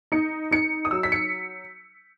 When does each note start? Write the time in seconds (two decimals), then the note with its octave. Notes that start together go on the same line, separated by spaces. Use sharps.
0.12 D#4 C#7
0.51 D#4 C#7
0.85 D#6
0.91 F#3 E6
1.03 B6
1.12 C#7